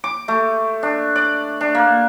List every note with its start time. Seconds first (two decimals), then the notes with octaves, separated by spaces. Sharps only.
0.04 D6
0.28 A3
0.83 D4
1.16 D5
1.61 D4
1.75 A#3